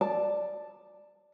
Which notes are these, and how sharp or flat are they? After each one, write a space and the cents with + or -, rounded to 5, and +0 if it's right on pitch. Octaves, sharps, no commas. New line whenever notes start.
D5 +5 A5 +0